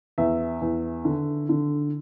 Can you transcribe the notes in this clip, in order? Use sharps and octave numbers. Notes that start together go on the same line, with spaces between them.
E2 E5
E2
D3
D3